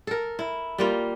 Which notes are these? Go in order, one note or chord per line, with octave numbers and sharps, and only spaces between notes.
A4 A#4
E4
G3 A#3 F4